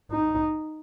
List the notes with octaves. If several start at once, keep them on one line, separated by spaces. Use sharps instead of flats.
D#4